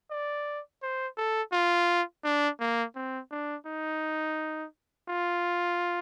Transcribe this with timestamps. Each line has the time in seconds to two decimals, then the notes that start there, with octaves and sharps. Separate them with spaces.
0.11 D5
0.82 C5
1.17 A4
1.53 F4
2.24 D4
2.60 A#3
2.95 C4
3.31 D4
3.66 D#4
5.09 F4